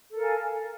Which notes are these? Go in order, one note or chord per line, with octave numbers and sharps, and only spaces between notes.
A4 A#4 F5 G#5